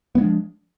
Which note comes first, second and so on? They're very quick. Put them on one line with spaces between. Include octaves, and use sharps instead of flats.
B3 G#3 D4 F3